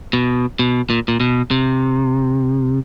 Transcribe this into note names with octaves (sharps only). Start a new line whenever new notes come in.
B2
B2
A#2
A#2
B2
C3